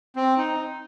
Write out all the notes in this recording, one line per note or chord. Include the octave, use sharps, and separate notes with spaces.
C4
D#4